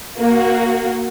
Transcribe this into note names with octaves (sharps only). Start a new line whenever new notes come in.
A#3 F#4